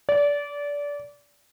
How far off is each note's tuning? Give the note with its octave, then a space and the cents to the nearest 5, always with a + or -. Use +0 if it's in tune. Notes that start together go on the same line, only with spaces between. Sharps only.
D5 -25